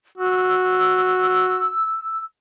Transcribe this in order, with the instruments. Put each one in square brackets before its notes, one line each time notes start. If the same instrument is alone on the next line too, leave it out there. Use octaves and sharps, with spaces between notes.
[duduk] F#4 [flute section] E6